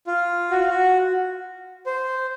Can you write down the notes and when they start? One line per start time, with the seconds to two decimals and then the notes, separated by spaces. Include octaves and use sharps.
0.07 F4
0.51 F#4
0.60 F4
0.70 F#4
1.86 C5